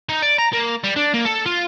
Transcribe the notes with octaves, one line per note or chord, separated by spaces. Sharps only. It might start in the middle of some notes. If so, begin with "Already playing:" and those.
D#4
D5
A#5
A#3
G3
D4
A#3
A4
F4